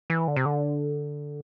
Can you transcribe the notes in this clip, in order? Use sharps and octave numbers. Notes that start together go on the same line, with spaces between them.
E3
D3
C3
D3